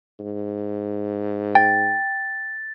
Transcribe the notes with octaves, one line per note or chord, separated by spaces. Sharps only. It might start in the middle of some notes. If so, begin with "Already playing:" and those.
G#2
G5 A6